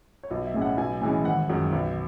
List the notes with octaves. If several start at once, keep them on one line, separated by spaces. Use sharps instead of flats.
C#5
B1 D#5
E5
A2 G#3 C#4 G#5
F#5
B1 G#5
A2 E3 G#3 C#4 G#5
G#1 F#5
F#2 D#3 G#3
B1